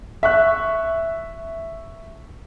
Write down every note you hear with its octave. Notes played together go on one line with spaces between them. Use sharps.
E5 C#6 F#6